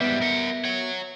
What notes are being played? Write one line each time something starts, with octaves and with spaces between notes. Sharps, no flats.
G#2 G3 B3 B4 E5
A#4 F#5
C#5 F#5